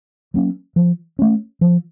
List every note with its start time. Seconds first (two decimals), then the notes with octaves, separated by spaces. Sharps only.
0.34 F#3 A#3 C#4
0.76 F3
1.19 A3 C#4
1.61 F3